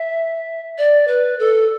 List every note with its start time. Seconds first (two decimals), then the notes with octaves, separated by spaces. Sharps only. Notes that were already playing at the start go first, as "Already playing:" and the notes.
Already playing: E5
0.78 D5
1.07 B4
1.39 A4